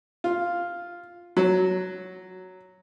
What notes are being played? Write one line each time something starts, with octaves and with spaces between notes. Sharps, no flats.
F4
F#3